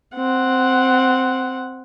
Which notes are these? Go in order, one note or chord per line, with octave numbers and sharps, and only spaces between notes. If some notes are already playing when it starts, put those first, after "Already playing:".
C4 F#5